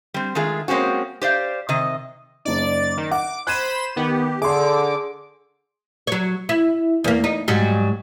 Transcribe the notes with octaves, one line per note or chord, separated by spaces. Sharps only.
G3 C4
D#3 G#3 A3 F4 G#4
G#3 A#3 C4 C#4 F#4
G4 C5 D5 F5
C3 D#3 D#5
F#1 D#4 D5 A6
D#3
F#5 D6
C5 B5 F#6 G#6 D#7 E7
D#3 B3 G4
D3 G#4 C6 D6
F#3 C#5
E4
E2 A#3
D#4
G#2 F#3 G3